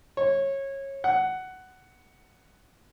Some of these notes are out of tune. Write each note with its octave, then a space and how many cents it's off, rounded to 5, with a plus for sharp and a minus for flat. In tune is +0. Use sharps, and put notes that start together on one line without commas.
C#5 -20
F#5 +10